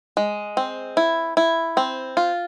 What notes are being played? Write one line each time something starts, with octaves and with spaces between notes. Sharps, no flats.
G#3
C4
E4
E4
C4
F4